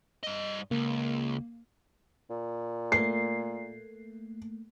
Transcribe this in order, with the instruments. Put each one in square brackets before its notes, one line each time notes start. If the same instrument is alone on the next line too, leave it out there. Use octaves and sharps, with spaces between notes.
[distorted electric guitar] G2 D#5
[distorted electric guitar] C#2 [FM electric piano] A#3
[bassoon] A#2
[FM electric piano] A3 A#3 [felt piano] C7